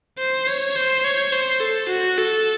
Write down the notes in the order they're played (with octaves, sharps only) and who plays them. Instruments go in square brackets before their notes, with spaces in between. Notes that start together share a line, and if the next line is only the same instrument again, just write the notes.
[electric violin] C5
C#5
C5
C#5
C5
A4
F#4
A4